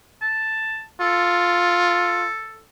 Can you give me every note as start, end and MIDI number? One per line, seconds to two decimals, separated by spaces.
0.22 0.83 81
1.01 2.27 65
1.01 2.63 69